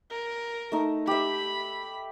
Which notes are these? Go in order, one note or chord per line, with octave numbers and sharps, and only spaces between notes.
A#4
A3 D#4
G4 E5 B5